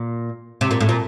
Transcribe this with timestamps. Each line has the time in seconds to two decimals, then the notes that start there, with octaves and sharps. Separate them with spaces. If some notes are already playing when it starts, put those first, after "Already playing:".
Already playing: A#2
0.61 C3
0.71 A#2
0.81 A2
0.89 A#2